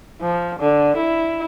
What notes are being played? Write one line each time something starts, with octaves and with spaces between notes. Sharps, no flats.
F3
D3
E4